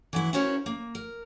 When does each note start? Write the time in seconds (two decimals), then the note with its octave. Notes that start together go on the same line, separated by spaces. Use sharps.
0.13 E3 F#3 E4
0.33 C#4 E4 F#4 A#4 C5 C#5
0.66 A#3
0.95 A#4